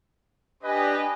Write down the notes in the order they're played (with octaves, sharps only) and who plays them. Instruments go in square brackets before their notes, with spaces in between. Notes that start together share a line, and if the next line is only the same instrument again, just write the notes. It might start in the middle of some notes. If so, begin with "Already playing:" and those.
[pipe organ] D4 G4 [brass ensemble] B4 D#5 [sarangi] G#5